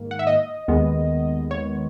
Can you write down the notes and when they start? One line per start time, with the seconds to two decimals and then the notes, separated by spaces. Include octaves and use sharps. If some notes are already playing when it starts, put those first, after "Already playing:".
Already playing: G#2 D#3 A#3
0.11 F#5
0.19 E5
0.27 D#5
0.68 D#2 D#3 G#3 B3
1.51 C#5